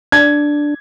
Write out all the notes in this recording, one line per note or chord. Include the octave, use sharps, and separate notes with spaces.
D4 G#6